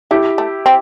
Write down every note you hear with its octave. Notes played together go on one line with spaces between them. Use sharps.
A3 E4 G4
A3
C4